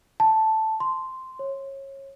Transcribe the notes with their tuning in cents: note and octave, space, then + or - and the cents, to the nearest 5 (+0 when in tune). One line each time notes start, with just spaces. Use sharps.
A5 +0
C6 -5
C#5 -25